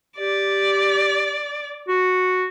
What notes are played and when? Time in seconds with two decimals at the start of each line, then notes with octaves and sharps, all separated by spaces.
0.18 G4 D5
1.88 F#4